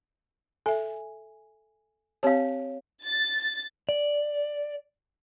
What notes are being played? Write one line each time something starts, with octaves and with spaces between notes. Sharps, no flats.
A4 E5 G#5
C4 G4 C#5 F5 A5
A6
D5